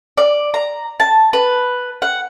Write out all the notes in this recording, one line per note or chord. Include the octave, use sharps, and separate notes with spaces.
D5
A#5
A5
B4
F#5